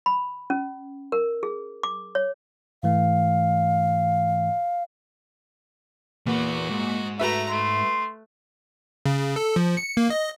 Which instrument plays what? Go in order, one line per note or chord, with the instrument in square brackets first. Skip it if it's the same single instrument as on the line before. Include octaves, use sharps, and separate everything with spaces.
[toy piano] B5
C#4
A#4
G#4
D6
C#5
[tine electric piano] G#2 E3 A3 [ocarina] F5
[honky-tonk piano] A#2 [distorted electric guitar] E3 B3 [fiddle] F#4
[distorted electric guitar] G#2
[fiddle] A3 A#5 [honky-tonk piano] F#4 B4 E5
[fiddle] A3 [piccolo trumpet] C6
[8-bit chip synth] C#3
A4
F3
C#7
A#3
D#5